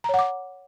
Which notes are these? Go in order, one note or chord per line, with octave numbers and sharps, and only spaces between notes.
C#5 F#5 A#5 D6